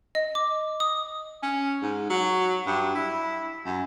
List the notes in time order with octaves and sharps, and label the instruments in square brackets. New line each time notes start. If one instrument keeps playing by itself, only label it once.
[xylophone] D#5
D6
D#6
[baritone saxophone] C#4
G#2
F#3
G2
E4
F#2